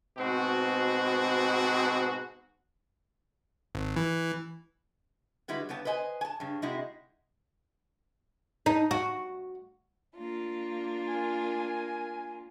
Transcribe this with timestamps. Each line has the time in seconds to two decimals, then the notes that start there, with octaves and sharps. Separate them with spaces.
0.18 G#2 B2 C4 F#4
3.75 G#1
3.96 E3
5.48 D3 G3 G#3 E4 F#4 B4
5.69 C#3 G3 B3 A5
5.85 B4 C5 D#5 G5 G#5
6.21 G#5 A5
6.40 G2 C#3
6.62 C3 G#3 D#4 E4 F#4
8.66 D#4
8.91 F#4
10.16 A#3 D4 F4
11.08 A#4 G#5